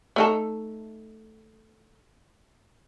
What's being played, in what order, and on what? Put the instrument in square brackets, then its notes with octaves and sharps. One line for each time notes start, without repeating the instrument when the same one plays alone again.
[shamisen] A3 D#4 A4